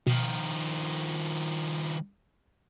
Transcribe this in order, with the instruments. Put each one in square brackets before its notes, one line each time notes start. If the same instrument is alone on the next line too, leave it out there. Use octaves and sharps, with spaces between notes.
[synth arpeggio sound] B2 [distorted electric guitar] D#3 F3